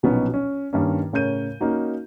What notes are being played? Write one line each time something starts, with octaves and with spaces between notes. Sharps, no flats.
A#1 B2 F#3 B3 C#4 D#4
C#4
G2 D#3 A#3 C#4
A2 C#3 A#4 C#5 G6 D#7
A#3 C#4 D#4 F#4